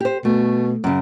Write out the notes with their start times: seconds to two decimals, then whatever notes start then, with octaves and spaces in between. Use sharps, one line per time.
0.01 G4 C5
0.25 B2 A3
0.84 F#2 C#3